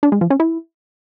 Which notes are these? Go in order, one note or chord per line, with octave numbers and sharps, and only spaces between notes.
D4
G#3
F3
C#4
E4